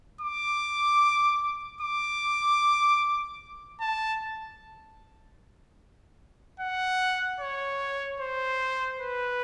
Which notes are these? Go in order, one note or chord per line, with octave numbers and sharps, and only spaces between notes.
D6
D6
A5
F#5
C#5
C5
B4